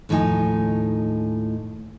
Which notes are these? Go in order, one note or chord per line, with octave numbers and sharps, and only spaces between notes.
D#2 A2 F3 D#4 G#5